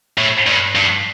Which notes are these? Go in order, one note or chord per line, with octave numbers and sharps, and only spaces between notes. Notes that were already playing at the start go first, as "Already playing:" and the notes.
A2
G2
G2